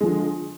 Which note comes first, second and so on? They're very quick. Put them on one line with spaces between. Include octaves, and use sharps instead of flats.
G#3 F3 D3